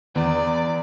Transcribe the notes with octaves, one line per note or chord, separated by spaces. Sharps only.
E2 D5